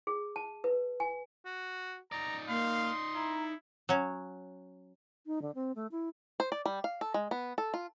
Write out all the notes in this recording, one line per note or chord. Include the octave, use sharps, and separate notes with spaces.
G#4
A5
B4
G#5
F#4
D#4 D5 A#5
A#3 F5 C6
E4 A#5
F#3 C#4
D#4
D3
C4
A3
E4
C5
D5
G3
F5
A4
G#3
B3
A4
F4